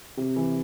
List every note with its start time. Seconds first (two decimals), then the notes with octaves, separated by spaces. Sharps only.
0.17 C3
0.36 E3